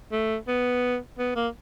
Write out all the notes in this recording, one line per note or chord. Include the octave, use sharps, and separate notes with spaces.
A3
B3
B3
A#3